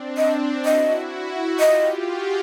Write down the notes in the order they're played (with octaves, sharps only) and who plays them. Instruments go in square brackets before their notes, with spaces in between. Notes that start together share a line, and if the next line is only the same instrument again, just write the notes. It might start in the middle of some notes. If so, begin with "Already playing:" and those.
Already playing: [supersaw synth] C4 D4
[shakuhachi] D#5
[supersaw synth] E4 F#4 [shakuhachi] D#5
[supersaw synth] F4 G4 [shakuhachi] D#5
[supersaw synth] F#4 G#4